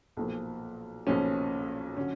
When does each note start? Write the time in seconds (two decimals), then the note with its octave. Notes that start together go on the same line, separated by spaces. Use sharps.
0.17 B1 A#2 F3
1.07 B1 A#2 F3 C#4
1.97 D3 F#3 C#4